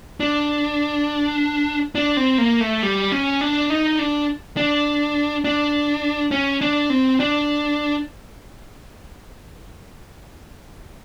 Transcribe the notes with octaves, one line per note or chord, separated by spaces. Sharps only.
D4
D4
C4
A#3
A3
G3
C#4
D4
D#4
D4
D4
D4
C#4
D4
C4
D4